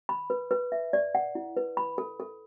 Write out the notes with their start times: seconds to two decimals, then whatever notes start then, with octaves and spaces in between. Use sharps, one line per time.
0.09 B5
0.30 B4
0.51 B4
0.72 E5
0.93 D5
1.15 F#5
1.35 E4
1.57 B4
1.77 B5
1.98 A4
2.20 A4